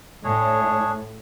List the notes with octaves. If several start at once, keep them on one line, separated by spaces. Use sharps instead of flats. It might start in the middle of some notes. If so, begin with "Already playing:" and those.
A2 D4 G#4 C#5